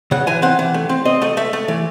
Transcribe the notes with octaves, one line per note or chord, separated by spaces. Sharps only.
C#3 F#5
E3 G#5
C4 F#5
E3
A3
C4
C4 D#5
A3 D#5
A3 E5
A3
E3